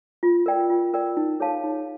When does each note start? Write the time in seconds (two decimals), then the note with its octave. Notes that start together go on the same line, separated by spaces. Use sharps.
0.23 F4
0.46 A#4 D5 G5
0.70 F4
0.94 A#4 D5 G5
1.17 D#4
1.40 G#4 C#5 F5 A5
1.64 D#4